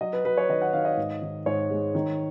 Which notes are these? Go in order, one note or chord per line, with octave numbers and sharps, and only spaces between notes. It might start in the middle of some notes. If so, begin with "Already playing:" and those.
F#3 D#5
B4
F#3 B4
C#5
D#3 D#5
F#5
D#3 F5
D#5
G#2
D#3
G#2 C#5
G#3
D#3